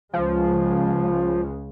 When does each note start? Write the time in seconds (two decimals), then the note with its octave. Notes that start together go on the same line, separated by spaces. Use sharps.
0.14 C#2 C#3 F3 G#3